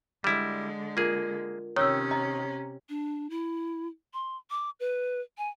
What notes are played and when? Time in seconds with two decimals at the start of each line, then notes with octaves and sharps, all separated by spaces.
0.24 D3 G3 G#3 E4
0.97 A#3 F4 G#4 A#4
1.76 C3 D#3 C#4 C#5 E6
2.11 D#5 A#5
2.89 D4
3.30 E4
4.14 C6
4.50 D6
4.80 B4
5.38 G#5